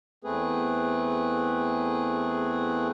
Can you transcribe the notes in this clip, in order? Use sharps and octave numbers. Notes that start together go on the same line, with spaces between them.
E2 A3 C4 G#4 B4